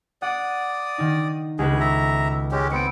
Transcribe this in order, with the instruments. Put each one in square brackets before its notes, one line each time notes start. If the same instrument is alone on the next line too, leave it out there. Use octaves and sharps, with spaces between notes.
[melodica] D5 D#6 [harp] F#5 D6
[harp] D#3 D#4
[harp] C#2 A3 B4 [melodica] G#4
[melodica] E5 A#5
G#3 C#4 G4
[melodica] B3 C4 [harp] C#7 D7